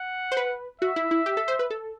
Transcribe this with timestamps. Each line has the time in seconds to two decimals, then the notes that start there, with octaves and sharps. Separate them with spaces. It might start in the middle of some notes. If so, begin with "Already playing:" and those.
Already playing: F#5
0.32 C5
0.37 B4
0.81 F#4 E5
0.96 E4
1.11 E4
1.26 G4
1.37 A4
1.48 C5
1.59 B4
1.70 A4